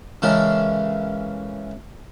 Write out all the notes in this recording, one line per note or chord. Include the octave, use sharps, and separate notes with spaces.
C#3 E3 G#3 A4 A#4